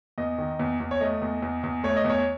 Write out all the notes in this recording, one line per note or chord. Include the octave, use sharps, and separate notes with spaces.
E2 D#5
D#3
E2
E2
C#5
A3 D#5
E2
E2
E2
A3 C#5
D#5
E2 C#5